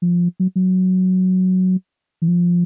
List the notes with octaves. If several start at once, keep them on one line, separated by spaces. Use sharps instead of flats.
F3
F#3
F#3
E3
F3